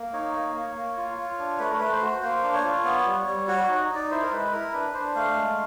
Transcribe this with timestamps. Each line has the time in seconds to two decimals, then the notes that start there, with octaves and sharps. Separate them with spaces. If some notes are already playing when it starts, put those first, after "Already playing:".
Already playing: A#3
0.13 D#4 C#5
0.34 A#3
0.55 A#3
0.76 A#3
0.97 F4
1.18 F4
1.39 D4
1.59 A3 B4
1.70 A#4
1.79 A3 B4
1.92 C5
2.02 F#4
2.22 A#3 C5
2.43 D4
2.54 C#5
2.64 F4
2.85 B3
3.06 G3
3.27 G3
3.48 F#4 C#5
3.64 D#4 C#5
3.89 D#4
3.95 D5
4.11 E4 C5
4.22 A#4
4.31 G#3 B4
4.52 E4 A#4
4.72 D4 B4
4.94 D4 C5
5.15 A3 F5
5.36 G#3